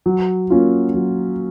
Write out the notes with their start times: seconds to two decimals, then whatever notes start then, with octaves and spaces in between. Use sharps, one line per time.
0.06 F#3
0.50 A#3 C#4 F4
0.94 F#3